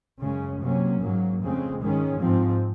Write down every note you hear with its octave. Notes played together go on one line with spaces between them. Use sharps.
F#2 C#3 G#3 C#4
C3 F#3 A#3 C#4
G#2 F#3 A#3
F2 C#3 G#3 C4
G#2 D#3 G#3 C#4
G#2 F3 C4